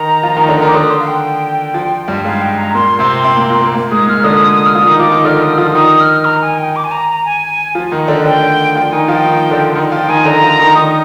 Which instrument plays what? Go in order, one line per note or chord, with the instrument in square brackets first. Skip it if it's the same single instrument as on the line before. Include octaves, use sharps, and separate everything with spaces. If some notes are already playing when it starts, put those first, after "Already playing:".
Already playing: [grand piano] D#3 D#4 [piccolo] A#5
[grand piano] F3 F4
D#3 D#4
D3 D4
D#3 D#4
[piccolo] D6
[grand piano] D3 D4 [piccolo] D#6
[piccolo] C6
F5
G5
[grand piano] F3
G2 G3
[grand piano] G#2 G#3 [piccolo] F5
[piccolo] G5
A#5
[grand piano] A#2 A#3 [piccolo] C6
[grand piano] C3 C4
C3 C4
A#2 A#3
A#2 A#3
A#2 A#3
A#2 A#3
[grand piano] G#2 G#3 [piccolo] D#6
[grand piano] A#2 A#3 [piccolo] F6
[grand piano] D3 D4 [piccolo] D#6
[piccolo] F6
[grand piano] F3 F4 [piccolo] D#6
[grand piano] D#3 D#4
[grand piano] F3 F4 [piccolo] D6
[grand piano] D#3 D#4
[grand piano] D3 D4 [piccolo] F6
[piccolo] D#6
F6
[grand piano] F3 F4 [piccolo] D#6
[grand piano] D#3 D#4 [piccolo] D#6
[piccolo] F6
A#5
G#5
G5
D6
G#5
A#5
A#5
G#5
[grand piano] F3 F4
D#3 D#4
D3 D4
[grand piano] D3 D4 [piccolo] G5
[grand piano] F3 F4 [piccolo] G5
[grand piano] D#3 D#4 [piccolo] G#5
[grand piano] F3 F4 [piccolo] G5
[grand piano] D#3 D#4
D3 D4
D#3 D#4
[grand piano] F3 F4 [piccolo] G5
[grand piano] D#3 D#4 [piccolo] G#5
[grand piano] D3 D4 [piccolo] A#5
[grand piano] F3 F4
D#3 D#4
[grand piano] D#3 D#4 [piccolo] D#6